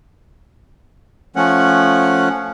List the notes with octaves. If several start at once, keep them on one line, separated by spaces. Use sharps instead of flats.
F3 A3 C#4 F#5